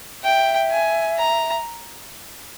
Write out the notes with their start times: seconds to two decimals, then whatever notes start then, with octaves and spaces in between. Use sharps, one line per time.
0.23 E5 G5
0.70 G#5
1.18 A#5